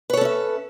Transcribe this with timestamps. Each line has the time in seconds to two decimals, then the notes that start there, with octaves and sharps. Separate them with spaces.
0.10 B4
0.13 C#5
0.17 A4
0.21 C#4
0.25 E5